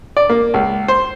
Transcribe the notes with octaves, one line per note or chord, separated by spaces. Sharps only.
D5
A#3
C#2
C5